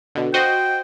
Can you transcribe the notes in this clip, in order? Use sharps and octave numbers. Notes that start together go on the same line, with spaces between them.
B2 D3
F#4 C5 D#5 G5